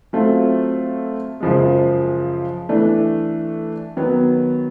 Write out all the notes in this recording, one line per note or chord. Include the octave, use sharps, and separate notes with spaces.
F#3 A3 C4 F4
F#2 C#3 F3 G#3
E3 A3 D4
D#3 F#3 B3